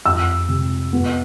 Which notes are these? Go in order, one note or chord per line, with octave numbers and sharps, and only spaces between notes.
F2 E6
C3
B3